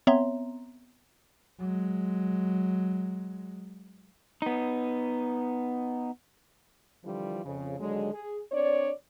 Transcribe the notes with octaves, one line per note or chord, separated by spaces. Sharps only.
B3 C4 C#5 E5 A#5 C6
F#3 G#3
B3 D#4
D3 E3 F3 G3 F4
F2 C#3
D#2 D3 F#3 G#3
G#4
C4 D4 C#5 D5